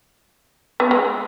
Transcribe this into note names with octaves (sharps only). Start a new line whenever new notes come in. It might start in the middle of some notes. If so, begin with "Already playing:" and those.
B3
G#3